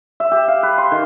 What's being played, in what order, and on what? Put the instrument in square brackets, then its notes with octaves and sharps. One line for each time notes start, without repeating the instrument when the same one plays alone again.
[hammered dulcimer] E5
G4
F5
B4
C6
D#3